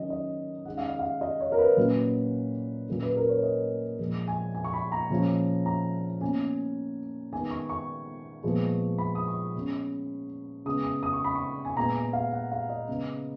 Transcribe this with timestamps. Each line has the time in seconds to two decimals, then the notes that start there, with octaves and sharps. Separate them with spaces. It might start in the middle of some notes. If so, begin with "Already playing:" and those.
Already playing: D#3 F#3 C#4 D#5
0.10 D#5
0.65 D#3 G#3 C#4 F#5
0.78 F5
0.89 D#5
0.99 F5
1.21 D#5
1.41 C#5
1.52 A#4
1.58 B4
1.77 A#2 F#3 A#3 C#4
2.88 A#2 F#3 A#3 C#4
3.03 B4
3.16 A#4
3.29 C#5
3.43 D#5
3.99 A#2 F3 G#3
4.27 G#5
4.55 G#5
4.64 C#6
4.73 B5
4.92 A#5
5.10 A#2 F3 G#3 C#4
5.66 A#5
6.21 B2 A#3 C#4 G#5
7.32 D#3 G#3 B3 G#5
7.51 C#6
7.69 C#6
8.43 A#2 F3 G#3 B3
8.98 B5
9.15 D#6
9.27 C#6
9.55 B2 G#3 C#4
10.65 C#3 G#3 B3 D#6
10.84 D#6
11.03 D#6
11.13 C#6
11.24 B5
11.35 C#6
11.65 G#5
11.77 A#2 G#3 B3 A#5
11.96 G#5
12.13 F5
12.33 F#5
12.51 F5
12.69 D#5
12.87 C#3 G#3 B3